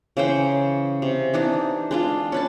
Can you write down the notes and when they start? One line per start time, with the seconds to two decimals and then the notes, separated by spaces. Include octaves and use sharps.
0.17 C#3 E3 C5 G5
1.02 C3
1.34 E3 D4 D#4
1.91 G#3 D4 F4
2.32 C#4 B4 A5